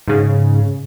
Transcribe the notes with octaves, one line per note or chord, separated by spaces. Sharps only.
G#2 C#3